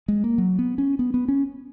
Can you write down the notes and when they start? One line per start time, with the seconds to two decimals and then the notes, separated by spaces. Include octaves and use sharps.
0.08 G#3
0.24 A#3
0.38 F#3
0.59 B3
0.78 C#4
0.99 B3
1.14 B3
1.28 C#4